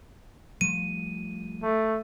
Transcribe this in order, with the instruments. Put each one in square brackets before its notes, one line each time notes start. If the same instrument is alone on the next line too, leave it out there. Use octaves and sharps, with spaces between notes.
[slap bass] F3 G3 A3 [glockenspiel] D#7
[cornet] A3